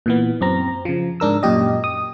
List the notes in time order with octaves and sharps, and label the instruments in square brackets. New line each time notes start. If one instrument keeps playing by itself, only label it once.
[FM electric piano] A#2 E3 B3
F#2 C4 A#5
C#3 F3
G#2 D4 A#4 E6
F#2 A#2 G4 D#5
D#6